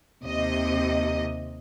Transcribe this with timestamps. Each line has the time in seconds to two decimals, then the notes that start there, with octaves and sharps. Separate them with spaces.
0.23 D#2 C3 D#5